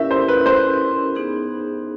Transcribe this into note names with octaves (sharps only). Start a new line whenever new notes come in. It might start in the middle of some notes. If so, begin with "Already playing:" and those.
Already playing: C#4 E4 G4 A#4 E5
C5
B4
C5
B3 D#4 G#4